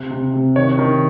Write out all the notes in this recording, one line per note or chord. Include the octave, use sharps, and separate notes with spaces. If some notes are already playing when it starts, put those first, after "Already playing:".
Already playing: C3
C3
C3
D#3 C#5
D#3